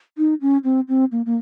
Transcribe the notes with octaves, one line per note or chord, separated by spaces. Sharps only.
D#4
C#4
C4
C4
A#3
A#3